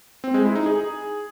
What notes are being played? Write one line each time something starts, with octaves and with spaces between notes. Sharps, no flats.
C4
G#3
E4
D#4
G#4